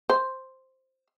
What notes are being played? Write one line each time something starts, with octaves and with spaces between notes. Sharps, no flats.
C5